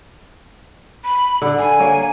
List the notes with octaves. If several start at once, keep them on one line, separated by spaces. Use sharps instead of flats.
B5
D3
G#5
A#3 C#5